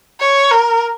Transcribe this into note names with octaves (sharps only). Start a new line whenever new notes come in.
C#5
A#4